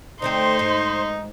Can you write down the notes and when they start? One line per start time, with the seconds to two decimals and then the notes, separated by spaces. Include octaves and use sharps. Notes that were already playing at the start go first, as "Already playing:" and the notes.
0.22 D3 A3 C4 D#4 C5 C6
0.59 G#2